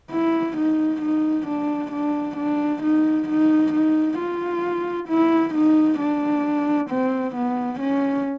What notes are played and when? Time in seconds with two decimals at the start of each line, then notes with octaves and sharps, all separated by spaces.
0.12 E4
0.57 D#4
1.01 D#4
1.47 D4
1.92 D4
2.37 D4
2.83 D#4
3.29 D#4
3.73 D#4
4.19 F4
5.08 E4
5.55 D#4
6.00 D4
6.90 C4
7.35 B3
7.80 C#4